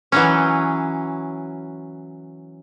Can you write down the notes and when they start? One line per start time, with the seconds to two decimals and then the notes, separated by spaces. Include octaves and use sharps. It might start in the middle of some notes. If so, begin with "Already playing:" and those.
0.12 E3 F#3 C#4